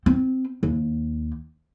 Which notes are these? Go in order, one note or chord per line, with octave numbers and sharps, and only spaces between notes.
C4
D#2